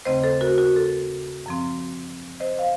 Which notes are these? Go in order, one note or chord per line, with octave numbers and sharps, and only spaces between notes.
D#2 C#3 A3 C4 C5 D#5
A4 C5
F#4 A#4
F#4
A4
F#2 F3 C4
C5 D#5
F5